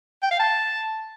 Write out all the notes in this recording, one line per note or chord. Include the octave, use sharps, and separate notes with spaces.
G5
F5
A5